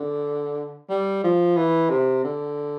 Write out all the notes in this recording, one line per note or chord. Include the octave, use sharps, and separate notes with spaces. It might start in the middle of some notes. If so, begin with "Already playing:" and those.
Already playing: D3
G3
F3
E3
C3
D3